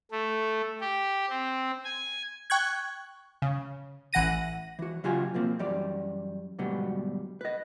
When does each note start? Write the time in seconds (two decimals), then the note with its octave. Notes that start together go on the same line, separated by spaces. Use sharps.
0.11 A3
0.81 G4
1.29 C4
1.85 G#5
2.50 G5 C#6 F#6 G#6
3.42 C#3
4.13 A1 E3 F#5 A#6 D#7
4.79 E3 F#4
5.04 C#3 F#3 F4 G4 G#5 C6
5.34 B2 F3 A#3 C4
5.59 F#2 E3 G3 D5
6.59 D2 G#2 B2 F#3 G3 B3
7.41 B4 D#5